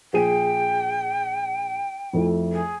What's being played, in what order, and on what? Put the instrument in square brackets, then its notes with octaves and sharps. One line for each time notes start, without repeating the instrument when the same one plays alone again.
[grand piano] A#1 G#4 D#7 [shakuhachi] G5
[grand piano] F2 A3 E4
[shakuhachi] G#4